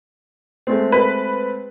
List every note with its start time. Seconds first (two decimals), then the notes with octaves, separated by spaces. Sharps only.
0.67 G#3 A3 C4
0.92 B4